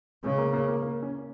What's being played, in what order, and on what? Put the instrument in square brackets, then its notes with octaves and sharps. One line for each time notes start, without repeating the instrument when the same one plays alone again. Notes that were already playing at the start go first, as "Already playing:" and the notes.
[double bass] C#3 [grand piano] G#3
[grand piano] A#3
A#3
A#3
A#3
C#4